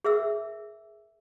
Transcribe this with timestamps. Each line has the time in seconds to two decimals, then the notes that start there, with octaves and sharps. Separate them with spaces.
0.04 G#4 A#4 E5 E6